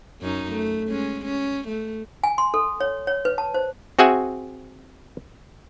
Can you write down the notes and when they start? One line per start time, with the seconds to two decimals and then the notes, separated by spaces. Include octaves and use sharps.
0.22 F#2 C#4 D#4
0.52 A3
0.89 G#3 C#4
1.25 C#4
1.68 A3
2.24 G#5
2.38 C6
2.54 A4
2.81 C#5
3.07 C#5
3.25 B4
3.38 A5
3.54 C5
3.99 C4 F#4 G#4 E5 F#5 G#5